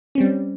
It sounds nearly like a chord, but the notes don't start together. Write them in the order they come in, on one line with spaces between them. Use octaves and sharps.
C#4 C4 G3